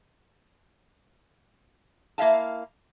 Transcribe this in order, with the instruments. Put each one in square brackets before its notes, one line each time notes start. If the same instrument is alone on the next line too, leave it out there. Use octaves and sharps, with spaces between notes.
[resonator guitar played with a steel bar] A#3 E4 E5 F5 A5